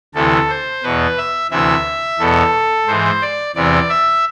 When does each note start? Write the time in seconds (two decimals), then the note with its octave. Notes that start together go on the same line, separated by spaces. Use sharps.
0.14 D2 C3 E3 A4
0.49 C5
0.83 E2 B2 B4
1.17 E5
1.51 D2 C3 E3 E5
2.19 E2 B2 A4
2.87 G#2 E3 C5
3.21 D5
3.55 E2 C3 E3 D5
3.89 E5